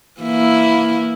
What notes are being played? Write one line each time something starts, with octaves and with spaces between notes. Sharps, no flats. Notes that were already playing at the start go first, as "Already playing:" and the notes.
E3 A#3 E4